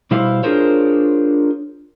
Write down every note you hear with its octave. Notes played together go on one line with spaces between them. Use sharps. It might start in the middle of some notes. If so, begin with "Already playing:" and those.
B2 G3 E4 C5 F5
D4 F4 G#4 A#4 C5 C#5